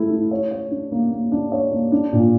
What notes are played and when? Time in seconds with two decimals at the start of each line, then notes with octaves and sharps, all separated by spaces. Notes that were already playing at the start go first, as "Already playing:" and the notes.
Already playing: A3 E4
0.10 E4
0.31 C#5
0.51 C#5
0.71 D4
0.92 A#3
1.11 A#3
1.32 D4
1.52 C#5
1.71 A#3
1.92 D4
2.12 A#2